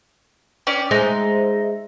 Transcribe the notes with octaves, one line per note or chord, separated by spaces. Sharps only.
C#4 D5 G5
G#3 D#4 G#4 C5 E5